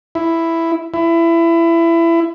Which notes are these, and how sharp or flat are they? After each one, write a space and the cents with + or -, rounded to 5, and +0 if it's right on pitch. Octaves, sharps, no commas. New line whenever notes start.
E4 +5
E4 +20